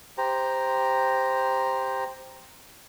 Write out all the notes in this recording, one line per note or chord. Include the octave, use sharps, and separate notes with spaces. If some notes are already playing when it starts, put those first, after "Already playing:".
G4 C5 A#5